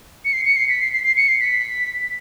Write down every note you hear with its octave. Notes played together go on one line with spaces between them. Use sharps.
C#7
C7
C#7
C7
B6
C7
C7
C7
C#7
C7
B6